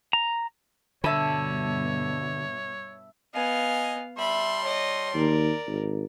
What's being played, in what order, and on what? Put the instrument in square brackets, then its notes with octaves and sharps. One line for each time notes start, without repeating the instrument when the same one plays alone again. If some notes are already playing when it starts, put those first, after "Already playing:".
[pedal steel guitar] A#5
[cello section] G2 B2 [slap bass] D3 [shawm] C#5 [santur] E5 A5 B5
[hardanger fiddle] B3 F5 [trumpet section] D#5 G#5
[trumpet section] G3 A5 C6 [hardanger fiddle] E5 B5
[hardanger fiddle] C#5 D#5
[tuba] D#2 [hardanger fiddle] A#4 D5
[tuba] G#1